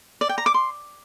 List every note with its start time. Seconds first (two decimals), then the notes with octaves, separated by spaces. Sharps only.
0.21 D5
0.29 G5
0.38 A#5
0.46 D6
0.54 C6